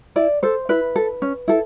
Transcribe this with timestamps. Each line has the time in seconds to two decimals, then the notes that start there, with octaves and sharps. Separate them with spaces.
0.16 E4 D5
0.43 A4 C5
0.69 E4 B4
0.96 A4
1.22 C#4
1.48 E4 A4